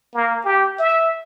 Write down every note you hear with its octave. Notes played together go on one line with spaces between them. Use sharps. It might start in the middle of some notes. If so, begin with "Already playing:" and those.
A#3
G4
E5